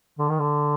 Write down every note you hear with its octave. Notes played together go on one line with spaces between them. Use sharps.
D3
D#3
D3